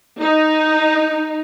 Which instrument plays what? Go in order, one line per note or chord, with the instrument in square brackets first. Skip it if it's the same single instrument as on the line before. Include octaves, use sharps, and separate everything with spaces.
[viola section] D#4